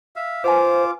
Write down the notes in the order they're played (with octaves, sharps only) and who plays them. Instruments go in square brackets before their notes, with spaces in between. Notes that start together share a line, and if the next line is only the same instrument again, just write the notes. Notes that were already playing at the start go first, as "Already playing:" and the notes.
[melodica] E5 F5
[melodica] F4 F5 D6 [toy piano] B4 F#5 G#5 [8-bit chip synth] C5